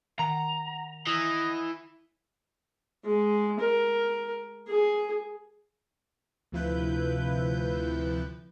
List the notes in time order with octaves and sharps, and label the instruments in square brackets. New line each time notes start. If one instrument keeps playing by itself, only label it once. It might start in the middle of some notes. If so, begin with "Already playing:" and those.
[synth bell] D#3 F#5 [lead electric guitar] A#5
[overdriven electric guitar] E3 [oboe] D#5
[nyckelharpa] G#3
A#4
G#4
[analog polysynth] D2 C3 F3 E4 B4 G6